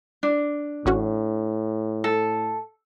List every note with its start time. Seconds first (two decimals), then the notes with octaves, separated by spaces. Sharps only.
0.23 D4
0.86 A1 A2 C#4 F#4
2.04 A4